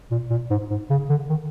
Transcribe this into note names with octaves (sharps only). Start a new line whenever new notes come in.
A#2
A#2
G#2
G#2
C#3
D3
D#3